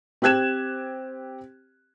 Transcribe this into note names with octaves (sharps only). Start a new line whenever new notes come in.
C4 G4 F#6 G#6 E7